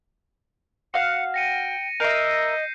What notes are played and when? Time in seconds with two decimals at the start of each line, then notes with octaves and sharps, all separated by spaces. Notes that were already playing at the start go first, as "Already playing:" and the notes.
0.94 F#4 F5 C#7
1.34 G5 A#6 C#7 D#7
2.00 A#4 D#5 E5 G6 C7